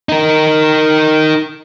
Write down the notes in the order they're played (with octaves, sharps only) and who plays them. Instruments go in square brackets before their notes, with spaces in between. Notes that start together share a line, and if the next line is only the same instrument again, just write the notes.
[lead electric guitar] D#4 A#4